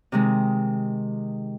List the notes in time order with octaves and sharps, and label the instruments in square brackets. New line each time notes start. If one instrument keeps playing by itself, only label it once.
[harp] C3 D#3 G#3